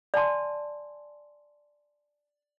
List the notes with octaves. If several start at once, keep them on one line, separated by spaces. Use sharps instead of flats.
D5 G#5 A5 C6